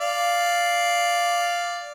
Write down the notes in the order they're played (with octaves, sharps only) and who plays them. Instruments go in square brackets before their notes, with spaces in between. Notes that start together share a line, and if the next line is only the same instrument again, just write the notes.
[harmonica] D5 F5